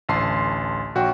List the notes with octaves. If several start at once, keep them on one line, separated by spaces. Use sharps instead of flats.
A1 D2 A5 C6 C7
A#1 F#4 C#5 F#5 G5